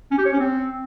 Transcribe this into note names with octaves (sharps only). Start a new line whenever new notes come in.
C#4
G4
C#5
C#4
C4